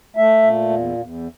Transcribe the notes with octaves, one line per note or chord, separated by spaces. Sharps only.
A3 E5
A#2
E2
E2